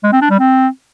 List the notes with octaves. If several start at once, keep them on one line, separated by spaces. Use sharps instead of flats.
G#3
C4
D4
G3
C4